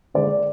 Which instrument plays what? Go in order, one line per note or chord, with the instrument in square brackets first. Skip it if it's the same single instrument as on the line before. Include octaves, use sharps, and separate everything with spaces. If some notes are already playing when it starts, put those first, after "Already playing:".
[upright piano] D3 G#3 D5